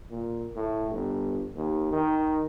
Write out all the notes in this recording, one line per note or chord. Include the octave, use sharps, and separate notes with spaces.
A#2
A2
G1
D#2
D#3